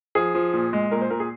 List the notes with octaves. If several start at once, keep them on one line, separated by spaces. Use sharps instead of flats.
F3 G#4
F3
A#2
G#3
A#2 A#4
C5
A#2 A#4
G#4